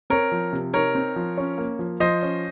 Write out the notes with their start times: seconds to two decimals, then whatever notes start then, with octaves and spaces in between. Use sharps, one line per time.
0.10 C4 A#4 C#5
0.32 F3
0.53 C3
0.74 D#4 A#4 C#5
0.95 C4
1.16 F3
1.38 C#4
1.58 A#3
1.79 F3
2.00 F3 C5 D#5
2.22 C#4